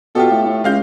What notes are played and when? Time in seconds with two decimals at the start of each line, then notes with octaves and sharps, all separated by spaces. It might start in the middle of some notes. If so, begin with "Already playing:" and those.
0.15 B2 F4 G4 A4
0.31 A2
0.46 A2
0.64 C#2 G#3 F5 G6